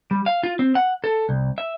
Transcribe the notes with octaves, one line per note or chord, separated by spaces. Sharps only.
G3
F5
F4
C4
F#5
A4
C2
E5